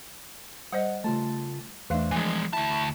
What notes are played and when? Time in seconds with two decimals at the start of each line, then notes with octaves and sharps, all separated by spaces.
0.73 G3 C5 D#5 F#5
1.04 C#3 A3 F4 A5
1.90 E2 E3 A3 D4 C5 E5 F5
2.11 E3 F3 G#3 G#5 D6 C7
2.53 D2 E4 A5 B5 C#6